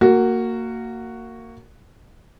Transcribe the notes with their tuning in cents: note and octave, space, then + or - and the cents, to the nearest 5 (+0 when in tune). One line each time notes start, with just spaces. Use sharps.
A#3 -20 F#4 +0